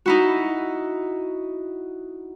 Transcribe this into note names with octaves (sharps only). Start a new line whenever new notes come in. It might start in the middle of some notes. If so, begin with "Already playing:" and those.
D#4 E4 F#4